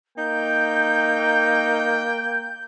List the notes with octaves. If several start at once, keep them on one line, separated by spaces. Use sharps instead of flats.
A#3 D#4 G5 G6